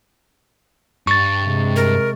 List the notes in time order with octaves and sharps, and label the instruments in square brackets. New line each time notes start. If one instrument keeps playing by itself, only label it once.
[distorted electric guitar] G2 [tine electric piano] C#6 A6
[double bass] C3 G#3
[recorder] A#4